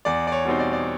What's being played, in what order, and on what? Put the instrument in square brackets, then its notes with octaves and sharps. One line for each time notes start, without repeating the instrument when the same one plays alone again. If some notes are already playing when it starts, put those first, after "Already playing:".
[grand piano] E2 D5
D5
C#5
B2 G3 C4 D#4
D5
D5